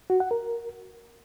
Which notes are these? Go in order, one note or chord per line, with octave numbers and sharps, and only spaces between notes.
F#4
F#5
A#4